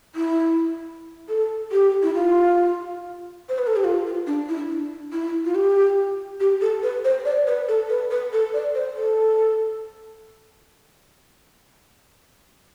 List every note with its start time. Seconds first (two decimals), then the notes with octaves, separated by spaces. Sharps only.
0.15 E4
1.28 A4
1.71 G4
2.02 E4
2.13 F4
3.48 C5
3.58 B4
3.67 A4
3.75 G4
3.84 F4
4.06 F4
4.26 D4
4.48 E4
4.69 D4
5.12 E4
5.45 F4
5.54 G4
6.40 G4
6.61 A4
6.82 B4
7.04 C5
7.25 D5
7.46 B4
7.68 A4
7.89 B4
8.10 B4
8.32 A4
8.53 D5
8.74 C5
8.96 A4